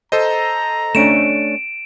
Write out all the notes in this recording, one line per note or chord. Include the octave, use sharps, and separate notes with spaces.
A4 C5 D#5 A#5
A3 C#4 D4 D7 E7